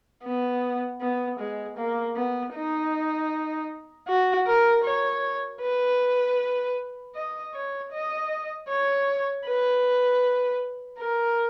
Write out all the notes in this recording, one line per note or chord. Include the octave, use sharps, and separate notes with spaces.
B3
B3
G#3
A#3
B3
D#4
F#4
A#4
C#5
B4
D#5
C#5
D#5
C#5
B4
A#4